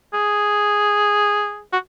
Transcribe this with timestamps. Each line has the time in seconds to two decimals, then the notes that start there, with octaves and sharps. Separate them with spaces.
0.14 G#4
1.73 F#4